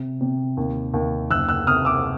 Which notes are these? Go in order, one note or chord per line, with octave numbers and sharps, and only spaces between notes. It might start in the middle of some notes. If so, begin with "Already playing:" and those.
Already playing: C3
C3
D#2
D#2
F#1 E6 F#6
E6 F#6
C3 D#6 F6
D6 E6